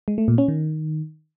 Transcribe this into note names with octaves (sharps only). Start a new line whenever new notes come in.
G#3
A3
A#2
C#4
D#3